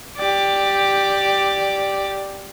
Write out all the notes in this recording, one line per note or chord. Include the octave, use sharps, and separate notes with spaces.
G4 D5